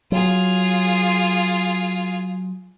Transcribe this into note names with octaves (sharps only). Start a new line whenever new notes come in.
F#3 F4 G#4